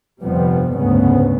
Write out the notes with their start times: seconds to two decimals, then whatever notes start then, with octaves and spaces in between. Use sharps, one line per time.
0.22 G1 F2 C3 F3 G3 B3
0.77 F#1 D2 G#2 C#3 B3